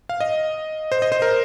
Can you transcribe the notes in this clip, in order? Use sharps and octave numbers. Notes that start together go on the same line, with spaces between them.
F5
D#5
C5
D#5
C5
A#4